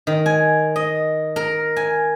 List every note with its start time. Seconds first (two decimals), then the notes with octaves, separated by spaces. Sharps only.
0.07 D#3
0.26 G#5
0.76 D#5
1.36 A#4
1.76 G#5